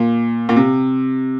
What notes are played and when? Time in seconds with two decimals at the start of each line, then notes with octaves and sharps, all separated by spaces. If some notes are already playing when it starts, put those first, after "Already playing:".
Already playing: A#2
0.49 A#2
0.56 C3